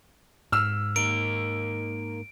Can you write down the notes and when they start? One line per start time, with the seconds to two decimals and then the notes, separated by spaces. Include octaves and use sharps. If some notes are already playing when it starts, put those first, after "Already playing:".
0.52 G#2 E6 F6
0.96 A#3 D#4 A#4 D7